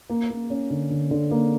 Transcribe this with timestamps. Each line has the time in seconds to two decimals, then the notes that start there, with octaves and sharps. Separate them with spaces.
0.09 A#3
0.30 A#3
0.50 C#4
0.70 D3
0.91 D3
1.11 D3
1.31 A#3